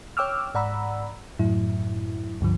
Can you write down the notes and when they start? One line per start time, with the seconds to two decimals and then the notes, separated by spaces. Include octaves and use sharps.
0.17 C#5 G5 D6 E6 F6
0.55 G#2 D5 F#5 A#5 B5 E6
1.39 F#2 A2 F#3 E4
2.41 C#2 G2 D3 F3